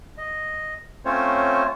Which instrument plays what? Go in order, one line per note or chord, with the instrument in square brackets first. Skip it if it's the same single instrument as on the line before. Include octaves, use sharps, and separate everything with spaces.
[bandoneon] D#5
A3 C4 C#4 F4 C5 C#5